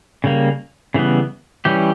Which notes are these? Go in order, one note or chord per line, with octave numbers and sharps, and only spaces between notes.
C#3 G3 A#3
C#3 E3 G3 B3
E3 G3 C#4 G4